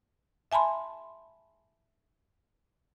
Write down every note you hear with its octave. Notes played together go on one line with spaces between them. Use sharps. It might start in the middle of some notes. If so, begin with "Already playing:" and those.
E5 G#5 A5 B5 C6